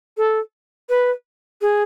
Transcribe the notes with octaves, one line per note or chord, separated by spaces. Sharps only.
A4
B4
G#4